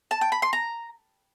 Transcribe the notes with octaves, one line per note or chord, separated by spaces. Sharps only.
A5
G5
B5
C6
A#5